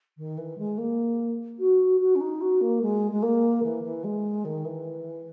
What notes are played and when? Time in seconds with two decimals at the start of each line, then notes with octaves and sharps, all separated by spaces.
0.18 D#3
0.38 E3
0.58 G#3
0.78 A#3
1.59 F#4
2.00 F#4
2.15 C#4
2.20 D#4
2.41 F#4
2.61 A#3
2.82 G#3
3.12 G#3
3.23 A#3
3.63 E3
3.84 E3
4.04 G#3
4.45 D#3
4.65 E3